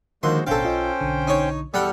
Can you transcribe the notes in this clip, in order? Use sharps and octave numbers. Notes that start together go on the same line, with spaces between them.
D#2 D3 F3 G#3 F#4 C5 C6
A1 B2 C#4 D4 A4 C5 F5 G5
B1 F4 D#5
B1 D3
D#4 C#5
E2 G3 A4 F#5 G5 E6 F6